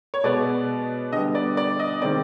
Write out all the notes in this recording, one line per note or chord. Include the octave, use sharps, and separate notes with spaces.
C#5
B2 G#3 B3 D5
D3 G3 B3 D#5
D5
D5
D#5
D#3 G#3 C4 D5